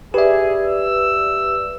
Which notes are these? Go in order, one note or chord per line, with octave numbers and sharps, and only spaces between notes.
G4 G#4 B4 D5 E5
E6